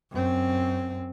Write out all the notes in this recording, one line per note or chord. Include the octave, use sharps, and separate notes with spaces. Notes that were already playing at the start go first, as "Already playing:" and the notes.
F#2 C4